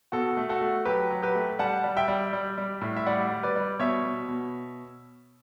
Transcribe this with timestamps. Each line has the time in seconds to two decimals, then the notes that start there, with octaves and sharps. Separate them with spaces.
0.12 B2 F#4 A4
0.37 A3
0.49 F#4 A4
0.61 A3
0.85 F#3 G4 B4
1.11 F#3
1.22 G4 B4
1.35 A3
1.59 G3 F#5 A5
1.84 G3
1.97 E5 G5
2.08 G3
2.33 G3
2.58 G3
2.81 A2
2.97 E5
3.06 G3 D5 F#5
3.31 G3
3.43 B4 D5
3.56 G3
3.79 B2 C#5 E5
4.05 B2
4.28 B2